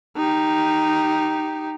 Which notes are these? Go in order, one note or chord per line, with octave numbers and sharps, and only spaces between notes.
D#4 G4